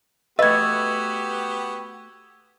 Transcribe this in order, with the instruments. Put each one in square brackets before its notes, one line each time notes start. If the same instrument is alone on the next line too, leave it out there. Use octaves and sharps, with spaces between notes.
[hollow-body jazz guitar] A3 B4 [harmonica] B3 F#4 G4 [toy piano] D#5 [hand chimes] E6 G#6